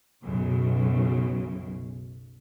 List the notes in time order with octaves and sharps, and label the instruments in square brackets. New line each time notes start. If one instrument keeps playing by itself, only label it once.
[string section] B1 F#2 C#3